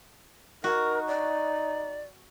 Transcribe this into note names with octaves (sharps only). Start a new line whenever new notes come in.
D#4 F#4 A#4
D5